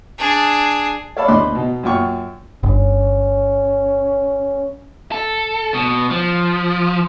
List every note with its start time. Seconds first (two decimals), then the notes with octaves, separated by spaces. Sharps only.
0.18 D4 G#4
1.17 C#5 D5 E5 F5 A5 B5
1.28 D2 D#5 B5 C6 D6 F#6
1.55 B2 D#4
1.83 F#2 A#2 F4 G5 C#6
2.63 G1 C#4
5.12 A4
5.74 B2
6.10 F3